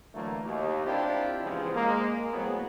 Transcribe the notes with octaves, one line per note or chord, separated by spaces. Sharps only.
D3 E3 F#3 A3 A#3
D#2
C4 D4 E4 F4 G4
E2 G#2 C#3 F3
G#3 A#3
A2 F#3 B3 C4 G#4